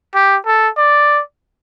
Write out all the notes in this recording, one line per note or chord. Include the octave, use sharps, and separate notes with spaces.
G4
A4
D5